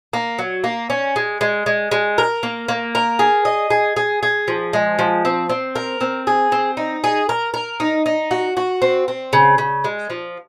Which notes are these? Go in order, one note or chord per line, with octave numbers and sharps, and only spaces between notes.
A#3
F#3
A#3
C#4
G#3
G#3
G#3
G#3
A#4
A#3
A#3
A#4
G#4
D#5
G#4
G#4
G#4
F3
G#3
F3
C4
C4
A#4
C4
G#4
C4
D#4
G#4
A#4
A#4
D#4
D#4
F#4
F#4
C4
C4
C#3
C#3
G#3
F3